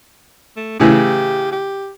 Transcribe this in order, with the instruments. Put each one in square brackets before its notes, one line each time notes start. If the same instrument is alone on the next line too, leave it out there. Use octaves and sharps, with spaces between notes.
[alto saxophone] A3
[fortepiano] A2 C#3 E3 [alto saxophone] G4
[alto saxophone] G4